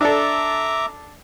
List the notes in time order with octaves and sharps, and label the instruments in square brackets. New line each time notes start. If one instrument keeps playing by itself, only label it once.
[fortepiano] D4 A4 [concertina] E5 A#5 D6